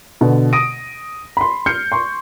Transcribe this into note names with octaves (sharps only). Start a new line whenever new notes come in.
B2 D3
D#6 A#6 D7 D#7
B5 C6
F6 G6 C7 C#7
C6 C#6